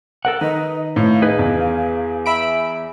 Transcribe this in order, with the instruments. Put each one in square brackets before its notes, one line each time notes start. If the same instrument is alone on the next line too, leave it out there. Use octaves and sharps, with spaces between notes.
[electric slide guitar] A4 A#4 F#5
[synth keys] D#3 [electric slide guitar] D#4 B4 [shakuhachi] D#5
[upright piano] A2 [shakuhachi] F5
[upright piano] D#4 [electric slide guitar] G#4 B4
[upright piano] E2
[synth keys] E5 B5 D7